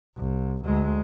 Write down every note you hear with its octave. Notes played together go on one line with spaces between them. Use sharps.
C2
D2 G#3